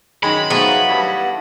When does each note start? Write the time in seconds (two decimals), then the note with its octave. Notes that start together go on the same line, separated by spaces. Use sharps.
0.23 F#2 D#3 F#3 G#3 B5
0.50 G#2 F#3 A3 B3 F4
0.89 G2 E4